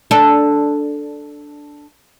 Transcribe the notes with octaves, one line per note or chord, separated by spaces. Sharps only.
D4 A4